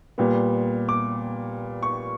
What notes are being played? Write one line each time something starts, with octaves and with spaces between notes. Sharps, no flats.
A#2 G3 B3
D6
C#6